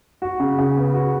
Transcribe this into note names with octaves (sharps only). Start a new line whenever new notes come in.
F#4
C#3
C#3
B3
F#4